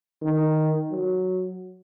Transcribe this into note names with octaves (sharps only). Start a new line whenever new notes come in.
D#3
F#3